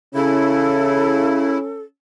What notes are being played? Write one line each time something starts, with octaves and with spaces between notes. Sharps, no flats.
C#3 C#4 E4 A4